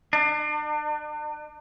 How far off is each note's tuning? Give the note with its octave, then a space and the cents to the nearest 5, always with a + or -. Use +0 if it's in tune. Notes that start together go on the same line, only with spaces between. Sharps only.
D4 +40